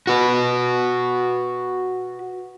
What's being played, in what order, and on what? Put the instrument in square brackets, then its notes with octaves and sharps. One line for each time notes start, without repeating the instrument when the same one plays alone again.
[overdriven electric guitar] F#4 B4